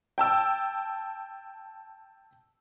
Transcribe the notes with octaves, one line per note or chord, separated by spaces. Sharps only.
G5 A5 E6